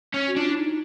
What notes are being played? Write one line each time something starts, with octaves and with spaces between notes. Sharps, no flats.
C#4
F#4
D4 F4
E4
D#4